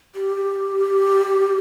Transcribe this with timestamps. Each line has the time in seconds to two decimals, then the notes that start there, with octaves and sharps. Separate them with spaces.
0.15 G4